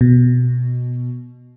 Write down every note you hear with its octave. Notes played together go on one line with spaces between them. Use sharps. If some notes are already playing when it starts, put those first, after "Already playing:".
B2